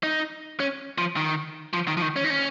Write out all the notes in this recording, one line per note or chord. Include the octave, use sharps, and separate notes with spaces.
D#4
C#4
F3
D#3
F3
D#3
F3
D#3
C#4
D#4
C#4